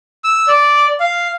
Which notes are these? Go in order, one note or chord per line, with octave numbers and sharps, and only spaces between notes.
E6
D5
F5